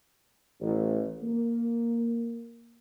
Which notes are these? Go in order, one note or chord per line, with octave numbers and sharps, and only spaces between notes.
A1
A#3